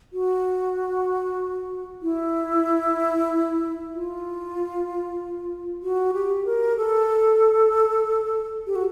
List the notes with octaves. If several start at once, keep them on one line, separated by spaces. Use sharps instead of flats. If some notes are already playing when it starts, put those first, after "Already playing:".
F#4
E4
F4
F#4
G4
A#4
A4
G4
F#4